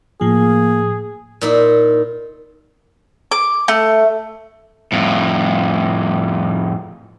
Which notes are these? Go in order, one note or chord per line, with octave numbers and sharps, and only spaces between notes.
A2 F3 A#3 G#4
A#2 D#4 E4
D6
A3
F2 A2